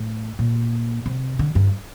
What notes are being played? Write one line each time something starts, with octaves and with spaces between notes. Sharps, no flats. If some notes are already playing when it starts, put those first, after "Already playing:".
Already playing: A2
A#2
C3
D3
G2